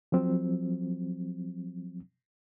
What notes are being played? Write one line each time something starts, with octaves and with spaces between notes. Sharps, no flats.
F3 F#3 C4